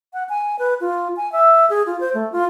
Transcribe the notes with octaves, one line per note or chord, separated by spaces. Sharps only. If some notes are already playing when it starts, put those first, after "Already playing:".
F#5
G#5
B4
F4
G#5
E5
G#4
F4
C5
A3
F4